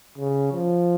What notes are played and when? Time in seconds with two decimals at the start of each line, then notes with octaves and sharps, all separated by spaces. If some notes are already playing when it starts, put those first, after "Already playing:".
0.18 C#3
0.53 F3